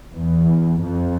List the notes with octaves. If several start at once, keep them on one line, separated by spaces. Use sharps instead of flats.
E2
F2